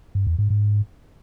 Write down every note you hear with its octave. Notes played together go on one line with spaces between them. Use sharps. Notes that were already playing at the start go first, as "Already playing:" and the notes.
G2
E2
G#2
G#2